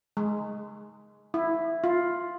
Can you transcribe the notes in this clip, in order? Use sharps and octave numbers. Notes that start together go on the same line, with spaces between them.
G#3
E4
F4